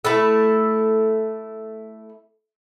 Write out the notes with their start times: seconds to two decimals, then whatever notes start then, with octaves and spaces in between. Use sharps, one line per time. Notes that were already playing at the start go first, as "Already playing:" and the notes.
0.05 A3 E4 A4